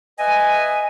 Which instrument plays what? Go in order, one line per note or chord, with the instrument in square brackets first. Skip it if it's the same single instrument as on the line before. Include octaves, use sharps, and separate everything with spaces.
[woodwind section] B4 D#5 E5 G#5